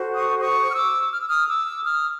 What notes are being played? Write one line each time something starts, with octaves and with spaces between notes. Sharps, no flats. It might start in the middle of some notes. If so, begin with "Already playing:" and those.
Already playing: F#4 A4 C5
C#6 D#6
C#6 D#6
F6
D6 E6
F6
E6
D#6 F6
D6 E6
D#6 F6